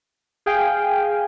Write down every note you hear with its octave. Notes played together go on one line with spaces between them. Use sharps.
G#4 F5 G5 G#5